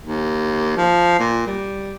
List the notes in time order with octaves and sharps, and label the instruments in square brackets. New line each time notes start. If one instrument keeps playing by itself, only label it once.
[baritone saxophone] D#2
F3
A#2
G3